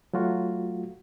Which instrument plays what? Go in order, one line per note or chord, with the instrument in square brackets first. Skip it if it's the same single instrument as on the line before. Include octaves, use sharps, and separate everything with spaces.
[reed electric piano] F#3 A3 F4 F#4